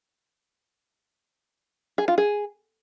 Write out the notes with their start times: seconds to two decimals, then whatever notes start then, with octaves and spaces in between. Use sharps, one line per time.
1.98 G#4
2.08 F4
2.18 G#4